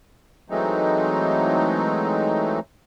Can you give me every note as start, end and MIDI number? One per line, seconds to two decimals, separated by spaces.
0.50 2.59 52
0.50 2.59 54
0.50 2.59 56
0.50 2.59 57
0.50 2.59 60
0.50 2.59 63